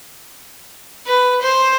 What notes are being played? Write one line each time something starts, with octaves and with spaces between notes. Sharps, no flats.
B4
C5